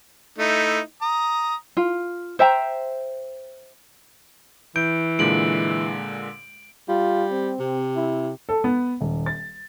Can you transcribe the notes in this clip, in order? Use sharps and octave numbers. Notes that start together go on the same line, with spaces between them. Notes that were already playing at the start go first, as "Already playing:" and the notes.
A3 D#4 E4
A#5 D#6
F4
C5 E5 G5 A#5
E3 G6 D7
A#2 D3 G#3 D7 F#7
G3 F4
C4
C3
E4
A4
B3
D#1
A6